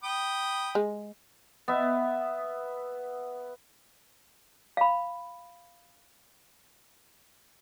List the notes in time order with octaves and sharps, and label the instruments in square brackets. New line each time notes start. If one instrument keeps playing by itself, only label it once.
[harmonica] G5 B5 D#6
[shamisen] G#3
[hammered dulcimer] B3 E5
[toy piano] F5 B5